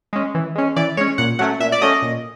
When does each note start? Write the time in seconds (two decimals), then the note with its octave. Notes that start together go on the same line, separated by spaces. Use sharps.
0.13 G#3 C#4
0.35 E3
0.55 G#3 C#4
0.76 E3 D5
0.97 G#3 C#4 C#5
1.18 A#2 F#5
1.39 F#3 A3 C#4 F#5
1.60 A#2 E5
1.72 D5
1.81 F#3 A3 C#4 D#5
2.02 A#2